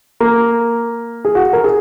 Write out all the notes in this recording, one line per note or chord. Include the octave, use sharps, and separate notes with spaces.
A#3
G#4
F#4
A#4
G#4